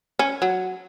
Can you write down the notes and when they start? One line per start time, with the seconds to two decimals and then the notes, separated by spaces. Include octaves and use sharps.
0.19 C#4
0.42 F#3